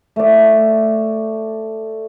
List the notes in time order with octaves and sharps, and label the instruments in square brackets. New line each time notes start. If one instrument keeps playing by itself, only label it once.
[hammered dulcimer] A3 D5